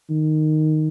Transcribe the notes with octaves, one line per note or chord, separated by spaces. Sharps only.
D#3